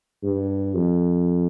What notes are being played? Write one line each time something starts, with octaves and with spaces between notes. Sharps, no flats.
G2
F2